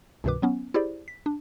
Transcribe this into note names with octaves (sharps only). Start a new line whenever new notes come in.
C2 G2 B2 D#3 B4 D6
F#3 B3 C#4
E4 G4 G#4 C5 D5
B6
D4